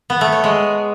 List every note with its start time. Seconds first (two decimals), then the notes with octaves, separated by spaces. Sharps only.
0.10 B3
0.21 A3
0.32 C#5
0.44 G#3